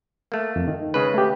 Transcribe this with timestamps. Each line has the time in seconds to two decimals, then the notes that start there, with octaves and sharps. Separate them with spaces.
0.32 A3 A#3
0.56 F2
0.68 D#3
0.94 C#3 G#3 B4
1.14 A3 G4